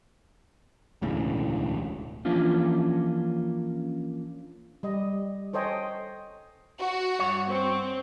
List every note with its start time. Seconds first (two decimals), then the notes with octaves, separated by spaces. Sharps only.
1.02 E1 D2 A2 C#3
2.25 E3 F3 A#3 C#4 D4 F4
4.83 G3 D#5
5.53 A4 C5 C#5 D#5 G5 G#5
6.78 F#4
7.19 G2 C#5
7.49 C4